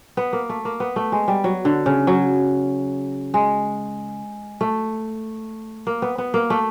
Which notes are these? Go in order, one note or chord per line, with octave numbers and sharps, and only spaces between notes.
B3
A#3
A3
A#3
B3
A3
G#3
G3
F#3
D3
C#3
F#3
G#3
A3
A#3
B3
B3
A#3
A3